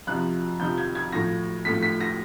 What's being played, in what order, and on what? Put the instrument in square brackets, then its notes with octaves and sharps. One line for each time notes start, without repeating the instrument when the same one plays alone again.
[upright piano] F2 C3 F3 F#6
F2 C3 F3 G6
G#6
G#6
A2 F3 A3 A#6
A2 F3 A3 B6
B6
A#6